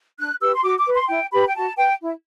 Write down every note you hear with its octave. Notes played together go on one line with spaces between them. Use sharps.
D4 F#6
G4 B4 E6
C6
F#4 D6
D6
B4
C6
E4 G5
G4 B4 B5
G5
F#4 A5
B4 G5
E4